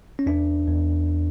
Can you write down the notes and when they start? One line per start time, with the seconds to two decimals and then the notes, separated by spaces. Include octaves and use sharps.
0.19 C#4
0.26 E2 D4
0.67 E2